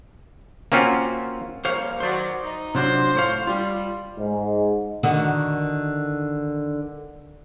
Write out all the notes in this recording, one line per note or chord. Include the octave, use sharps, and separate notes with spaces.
A#3 C4 C#4 F4 F#4
F3 G3 A#3 C5 C#5 F5
D#3 F#3 C5 D5
D#4
C3 F#3 D4 F4 C5
A2 C#5 F5
G3 F4
G#2
D3 D#3 F#4